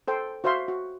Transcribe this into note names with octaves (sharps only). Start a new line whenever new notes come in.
A4 C5 G5
F#4 C5 E5 F5 C6
F#4